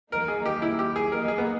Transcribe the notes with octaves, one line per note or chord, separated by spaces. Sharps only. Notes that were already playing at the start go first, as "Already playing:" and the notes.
D#3 A#3 D#4 A#4
G#4
G4
E4
G4
G#4
D#3 A#3 D#4 A#4
G#4
B3